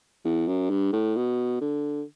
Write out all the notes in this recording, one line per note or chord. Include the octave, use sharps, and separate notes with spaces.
E2
F#2
G2
A2
B2
D3